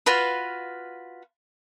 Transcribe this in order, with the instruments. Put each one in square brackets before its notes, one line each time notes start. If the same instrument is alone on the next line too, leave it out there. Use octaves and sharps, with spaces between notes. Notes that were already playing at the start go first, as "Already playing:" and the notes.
[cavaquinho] F4 F#4 B4 F5